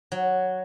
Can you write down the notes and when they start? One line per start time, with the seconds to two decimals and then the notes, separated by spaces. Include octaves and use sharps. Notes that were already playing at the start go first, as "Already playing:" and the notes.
0.12 F#3